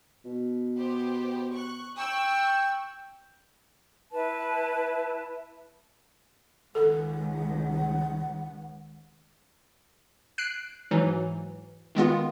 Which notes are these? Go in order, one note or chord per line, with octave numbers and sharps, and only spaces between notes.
B2
B3 G4 C5
C#6 F#6
G5 C#6 E6 F#6
E4 B4 A5
C#2 D#3 A4 F#5
F#6 C7 D7
G#2 E3 F#3
D#3 G#3 B3 F4